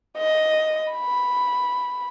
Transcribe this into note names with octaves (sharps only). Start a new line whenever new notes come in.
D#5
B5